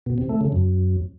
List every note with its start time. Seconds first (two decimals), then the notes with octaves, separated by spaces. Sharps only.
0.06 B2
0.18 C3
0.29 A3
0.41 C#3
0.52 F#2